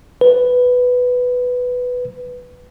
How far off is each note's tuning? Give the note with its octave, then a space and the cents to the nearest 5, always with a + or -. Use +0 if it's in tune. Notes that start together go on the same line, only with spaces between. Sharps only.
B4 +5